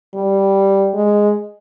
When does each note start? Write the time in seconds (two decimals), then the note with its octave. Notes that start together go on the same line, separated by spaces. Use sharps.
0.15 G3
0.94 G#3